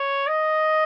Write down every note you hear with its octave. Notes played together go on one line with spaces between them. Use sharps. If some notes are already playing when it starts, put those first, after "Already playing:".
Already playing: C#5
D#5